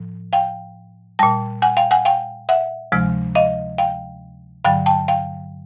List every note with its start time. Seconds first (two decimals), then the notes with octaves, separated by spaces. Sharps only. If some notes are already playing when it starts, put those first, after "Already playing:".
Already playing: A2 F3
0.33 F5 G5
1.19 A#2 G3 G5 A5
1.62 F#5 G#5
1.77 F5 G5
1.91 F#5 G#5
2.05 F5 G5
2.49 E5 F#5
2.92 D2 C3 F3 G#3
3.35 D#5 F5
3.78 F5 G5
4.65 G2 D3 F#3 F5 G5
4.86 G5 A5
5.08 F5 G5